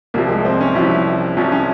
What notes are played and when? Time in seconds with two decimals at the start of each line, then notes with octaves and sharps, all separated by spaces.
0.14 C2 C3 F3 A#3
0.29 G#3
0.45 C4
0.61 C#4
0.75 C2 C3 F3 E4
1.37 C2 C3 F3 C#4
1.52 C#4